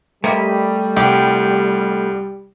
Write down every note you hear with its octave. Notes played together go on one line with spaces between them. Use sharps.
C3 G3 A3 A#3 D#5 B5
C2 G4